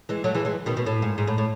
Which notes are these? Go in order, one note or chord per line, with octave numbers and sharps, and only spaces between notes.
E3 G#3
F#3 A3
E3 G#3
E3 G#3
B2 D#3
B2
A2
G#2
G#2
A2
A2